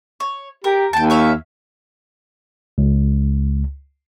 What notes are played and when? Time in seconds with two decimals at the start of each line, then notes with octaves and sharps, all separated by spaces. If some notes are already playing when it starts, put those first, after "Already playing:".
0.20 C#5
0.64 G4 A#4
0.93 D#2 G5 A5
1.10 C#5 E5 F5
2.78 C#2